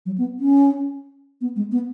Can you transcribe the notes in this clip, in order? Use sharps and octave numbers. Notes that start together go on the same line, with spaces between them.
F#3
B3
C#4
B3
G#3
B3